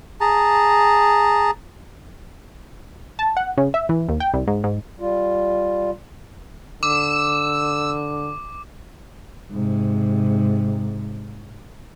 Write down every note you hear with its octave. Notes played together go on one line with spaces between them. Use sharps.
G#4 A5 A#5
A5
F#5
C#3
E5
E3
D#2
G5
C2
G#2
G#2
G3 F4
D3 D6 E6
G#2 C3